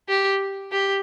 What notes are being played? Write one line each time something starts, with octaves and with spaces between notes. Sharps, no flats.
G4
G4